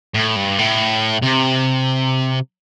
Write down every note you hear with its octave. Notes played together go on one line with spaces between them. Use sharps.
A2
G2
A2
C3